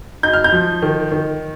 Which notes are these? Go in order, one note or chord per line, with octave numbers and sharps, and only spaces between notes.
D#4 G6
F6
G6
F3
D#3
D#3